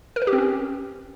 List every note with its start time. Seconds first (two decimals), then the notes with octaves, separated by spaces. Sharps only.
0.16 A#4
0.22 B4
0.27 G4
0.33 C4
0.38 C#4